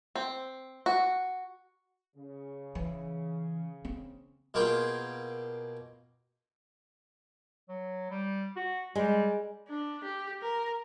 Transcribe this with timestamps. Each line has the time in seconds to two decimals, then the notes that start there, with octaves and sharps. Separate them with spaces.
0.15 C4
0.86 F#4
2.16 C#3
2.75 E3
3.85 C4
4.54 B2 A#3 F4 G#4 G5
7.69 F#3
8.11 G3
8.56 F#4
8.95 G3 G#3
9.69 D4
10.04 G4
10.42 A#4